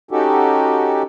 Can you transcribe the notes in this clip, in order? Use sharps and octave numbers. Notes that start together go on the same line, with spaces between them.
C#4 D#4 F#4 G4 A4